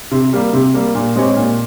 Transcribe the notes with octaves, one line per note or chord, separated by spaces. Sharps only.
C3
G3 A#3
C3
G3 A#3
A#2
G#3 C4 G4 C#5
A#2